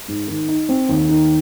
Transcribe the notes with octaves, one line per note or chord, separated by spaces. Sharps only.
G#2
D#3
D#4
C4
D#2
D#3